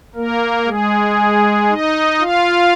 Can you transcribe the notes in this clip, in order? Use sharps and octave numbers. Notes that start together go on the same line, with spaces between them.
A#3 A#4
G#3 G#4
D#4 D#5
F4 F5